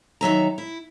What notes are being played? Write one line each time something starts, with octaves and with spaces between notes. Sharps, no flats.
D#3 F#3 E5 A#5
E4